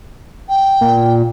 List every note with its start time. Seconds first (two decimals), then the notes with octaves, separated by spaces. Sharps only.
0.49 G5
0.81 A#2